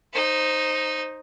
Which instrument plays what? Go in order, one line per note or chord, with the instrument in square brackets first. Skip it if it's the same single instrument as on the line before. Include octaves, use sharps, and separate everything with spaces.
[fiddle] D#4 C5